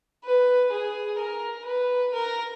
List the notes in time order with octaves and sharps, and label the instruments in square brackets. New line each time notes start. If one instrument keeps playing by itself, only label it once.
[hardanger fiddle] B4
G#4
A#4
B4
A#4